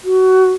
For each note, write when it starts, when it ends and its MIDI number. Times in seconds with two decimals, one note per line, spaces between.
0.04 0.51 66